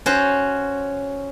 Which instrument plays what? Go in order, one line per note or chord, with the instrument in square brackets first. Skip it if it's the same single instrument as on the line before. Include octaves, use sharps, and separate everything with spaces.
[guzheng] C#4 F#4 C5